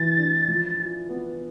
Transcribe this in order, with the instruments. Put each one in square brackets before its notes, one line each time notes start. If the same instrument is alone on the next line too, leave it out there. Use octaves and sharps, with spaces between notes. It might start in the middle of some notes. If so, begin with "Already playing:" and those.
Already playing: [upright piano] E3 [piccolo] A6
[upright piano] D4
F3
F4
B3